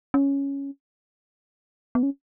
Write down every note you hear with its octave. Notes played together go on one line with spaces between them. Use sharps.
C#4
B3
C#4